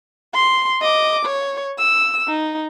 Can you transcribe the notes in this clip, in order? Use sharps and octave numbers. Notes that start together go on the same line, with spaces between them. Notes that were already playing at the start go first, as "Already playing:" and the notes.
C6
D#5 D6
C#5
E6
D#4